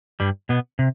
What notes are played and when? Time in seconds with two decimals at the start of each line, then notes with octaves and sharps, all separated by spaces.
0.20 G2 G3
0.49 B2 B3
0.79 C3